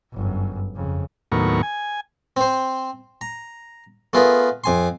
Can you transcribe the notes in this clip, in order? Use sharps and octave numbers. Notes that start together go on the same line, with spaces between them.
G1 F#2
F2 C#3
D#2 A2 F#3 B3 A#4 C#6
G#5
C4 C5
A#5
A3 B3 F4 G#4 A#4 B4
F2 G#5 C6